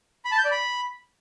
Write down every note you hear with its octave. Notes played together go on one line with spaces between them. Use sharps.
B5
A5
G6
D5
B5